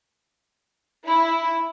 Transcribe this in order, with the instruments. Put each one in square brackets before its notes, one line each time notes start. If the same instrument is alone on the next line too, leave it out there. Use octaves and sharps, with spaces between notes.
[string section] E4